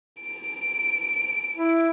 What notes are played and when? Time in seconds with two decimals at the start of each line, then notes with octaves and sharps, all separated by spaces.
0.21 D7
1.56 E4